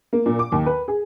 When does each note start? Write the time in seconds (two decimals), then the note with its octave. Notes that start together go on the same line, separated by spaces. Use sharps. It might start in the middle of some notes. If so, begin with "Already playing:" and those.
0.13 A#3
0.26 A#2
0.39 D6
0.52 D#2
0.66 B4
0.88 G#4